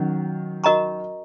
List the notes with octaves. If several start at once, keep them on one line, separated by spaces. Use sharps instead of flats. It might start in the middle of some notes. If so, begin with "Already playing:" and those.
Already playing: D#3 F#3 C#4
F#4 A#4 D#5 A#5 C#6